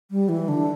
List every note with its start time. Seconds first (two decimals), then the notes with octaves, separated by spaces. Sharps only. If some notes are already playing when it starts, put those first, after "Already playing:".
0.11 G3
0.29 E3
0.48 D3